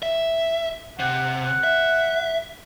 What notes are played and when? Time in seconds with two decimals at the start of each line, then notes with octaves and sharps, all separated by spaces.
0.03 E5
1.00 C3 F#5
1.64 E5